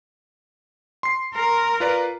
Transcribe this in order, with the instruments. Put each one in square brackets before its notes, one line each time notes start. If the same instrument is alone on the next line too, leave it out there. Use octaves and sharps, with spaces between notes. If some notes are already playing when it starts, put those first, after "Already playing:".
[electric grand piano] C6 C7
[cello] A#4
[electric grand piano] F4 B4 D5